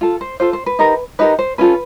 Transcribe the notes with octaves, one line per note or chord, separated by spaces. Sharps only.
F4 A4
C5
F4 A4 C5
C5
B4
D#4 G4 A#4
D#4 G4 A#4 B4
C5
C#4 F4 A4 B4